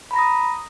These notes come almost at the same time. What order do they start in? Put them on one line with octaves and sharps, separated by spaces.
B5 A#5 A#6 D#6